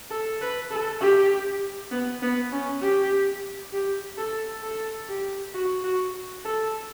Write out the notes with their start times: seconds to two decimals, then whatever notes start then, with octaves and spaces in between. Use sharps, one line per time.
0.10 A4
0.41 B4
0.71 A4
1.01 G4
1.91 B3
2.22 B3
2.52 C#4
2.82 G4
3.73 G4
4.18 A4
4.63 A4
5.09 G4
5.54 F#4
5.84 F#4
6.45 A4